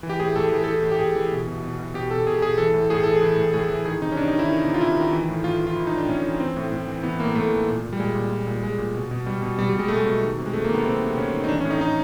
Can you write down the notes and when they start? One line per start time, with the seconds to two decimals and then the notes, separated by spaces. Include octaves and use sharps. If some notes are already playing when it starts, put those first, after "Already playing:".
0.03 E3
0.10 G4
0.20 A2 G#4
0.36 A2 A4
0.52 E3
0.64 E3 A4
0.83 A2
0.92 G4
0.99 A2 G#4
1.16 E3
1.32 B2
1.47 B2
1.62 B2
1.79 B2
1.94 B2 G4
2.11 B2 A4
2.26 B2 G#4
2.42 B2 G#4
2.58 E3 A4
2.74 A2
2.90 A2 G#4
3.03 E3 A4
3.16 G#4
3.22 E3
3.38 A2
3.53 A2 G#4
3.70 E3
3.85 D#3 G#4
4.01 C3 D#4
4.12 C#4
4.17 C3 D4
4.28 D#4
4.33 D#3
4.39 E4
4.49 D#3
4.65 C3
4.74 F4
4.81 C3 E4
4.97 D#3
5.13 E3
5.29 A2
5.44 A2 F4
5.60 E3
5.67 F4
5.76 E3 E4
5.87 D#4
5.92 A2
5.97 D4
6.08 A2 C#4
6.24 E3
6.40 E3 C4
6.57 A2
6.72 A2
6.87 E3
7.03 E3 B3
7.19 A2 A#3
7.35 A2 A3
7.52 E3
7.67 A#2
7.83 A#2
7.93 G3
8.00 A#2 G#3
8.15 A#2
8.31 A#2
8.47 A#2
8.63 A#2 G#3
8.78 A#2
8.95 B2
9.11 B2
9.26 B2 G3
9.42 B2
9.58 B2 G3
9.69 G3
9.74 B2
9.79 G#3
9.88 B2 A3
9.96 G#3
10.05 B2
10.22 D#3
10.38 C3
10.46 G#3
10.53 C3 A3
10.64 A#3
10.70 D#3 B3
10.85 D#3 C4
11.02 C3
11.17 C3 C#4
11.34 D#3
11.44 D#4
11.49 E3 D4
11.60 C#4
11.65 A2
11.71 D#4
11.81 A2 D#4